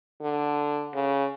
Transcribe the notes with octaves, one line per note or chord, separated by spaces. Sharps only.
D3
C#3